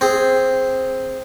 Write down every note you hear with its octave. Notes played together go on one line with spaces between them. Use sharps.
C4 G#4